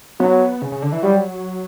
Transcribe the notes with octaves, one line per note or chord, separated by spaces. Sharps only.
F#3 B3
C#3
C#3
D3
E3
F#3 G3